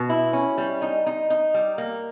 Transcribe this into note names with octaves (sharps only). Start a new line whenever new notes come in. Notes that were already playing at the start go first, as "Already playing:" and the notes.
Already playing: B2
E4
C#4
G3
D#4
D#4
D#4
G3
A#3